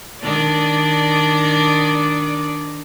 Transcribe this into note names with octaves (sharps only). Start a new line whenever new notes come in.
D#3 D4 D5